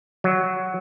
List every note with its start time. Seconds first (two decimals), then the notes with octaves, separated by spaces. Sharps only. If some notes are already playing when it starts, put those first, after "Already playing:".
0.24 F#3